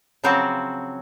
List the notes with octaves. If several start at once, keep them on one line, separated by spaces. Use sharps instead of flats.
C#3 F3 F#3 C4 F#4